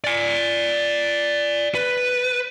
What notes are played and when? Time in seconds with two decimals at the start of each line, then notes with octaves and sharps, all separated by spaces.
0.04 D5 G#5
1.75 B4